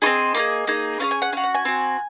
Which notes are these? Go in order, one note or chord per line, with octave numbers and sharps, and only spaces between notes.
C4 F4 G#4 D#5
A#3 F4 G#4
A#3 D#4 G#4
C#4 F4 G#4 F5
G#5
F#5
C#4 F#4 F5
F#5
G#5
C4 F#4